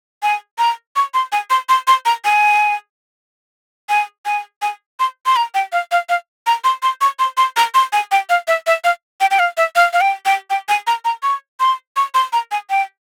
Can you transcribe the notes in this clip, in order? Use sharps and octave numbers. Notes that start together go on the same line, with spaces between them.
G#5
A#5
C#6
C6
G#5
C6
C6
C6
A#5
G#5
G#5
G#5
G#5
C6
C6
A#5
G5
F5
F5
F5
A#5
C6
C6
C#6
C6
C6
A#5
C6
G#5
G5
F5
E5
E5
F5
G5
G5
F5
E5
F5
F5
G5
G5
G5
G#5
A#5
A#5
C#6
C6
C#6
C6
A#5
G#5
G5